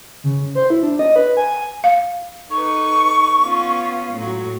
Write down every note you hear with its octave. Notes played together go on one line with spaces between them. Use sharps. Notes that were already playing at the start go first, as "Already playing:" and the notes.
C#3
C5
E4
D4
D#5
B4
G#5
F5
D#4 A4 B4 C#6
B3 C#4 F4
A2 F#3